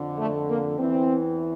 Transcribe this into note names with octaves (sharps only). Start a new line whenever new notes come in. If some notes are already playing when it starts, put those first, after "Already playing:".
Already playing: F2 D3
A3
A#3
E2 E3 C4